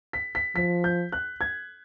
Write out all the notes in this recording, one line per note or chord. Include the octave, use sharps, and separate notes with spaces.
B6
B6
F3 B6
G6
F#6
G#6